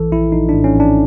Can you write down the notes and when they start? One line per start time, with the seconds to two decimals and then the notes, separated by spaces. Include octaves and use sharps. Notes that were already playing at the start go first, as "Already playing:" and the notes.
Already playing: A#1 E3 A4
0.11 A#1 E4
0.32 A#1 D#4
0.49 D4
0.53 A2
0.64 C#4
0.75 A#1 D4